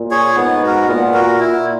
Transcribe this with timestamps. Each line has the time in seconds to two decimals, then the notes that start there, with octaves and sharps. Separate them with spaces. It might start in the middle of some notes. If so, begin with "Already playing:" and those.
Already playing: A#2
0.11 G#4 C#5
0.36 G#2 B3
0.62 F#4 A#4
0.88 A#2 B3
1.14 F#4 A#4
1.40 A#2 E4